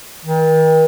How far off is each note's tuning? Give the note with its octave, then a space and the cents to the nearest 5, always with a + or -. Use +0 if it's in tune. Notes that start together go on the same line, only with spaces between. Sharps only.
D#3 +40